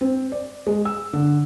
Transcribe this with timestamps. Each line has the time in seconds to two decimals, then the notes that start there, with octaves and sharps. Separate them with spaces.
0.01 C4
0.32 D5
0.67 G#3
0.85 E6
1.13 D3